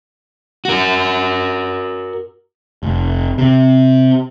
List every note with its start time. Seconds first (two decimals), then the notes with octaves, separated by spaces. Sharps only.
0.65 F#4 A#4
2.83 F1
3.38 C3